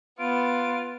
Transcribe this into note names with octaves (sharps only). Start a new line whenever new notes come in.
B3 F4 D7